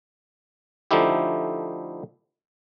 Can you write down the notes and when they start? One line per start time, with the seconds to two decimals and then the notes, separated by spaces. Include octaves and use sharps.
0.91 D3 F3 A3 D#4 E4 G4